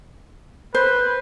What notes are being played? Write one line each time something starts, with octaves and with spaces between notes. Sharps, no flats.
B4 C5